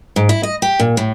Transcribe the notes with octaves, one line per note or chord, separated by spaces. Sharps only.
G#2
E4
D#5
G4
A#2
A2